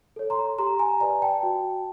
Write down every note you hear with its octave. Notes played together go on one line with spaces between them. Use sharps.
A4 C#5
A#5 C6
G4 A#5 C6
G#5 A#5
B4 D5 G#5 A#5
G5 A5
F#4